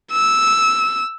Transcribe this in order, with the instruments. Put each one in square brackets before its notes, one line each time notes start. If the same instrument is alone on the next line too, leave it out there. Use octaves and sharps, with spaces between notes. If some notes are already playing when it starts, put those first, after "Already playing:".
[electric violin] E6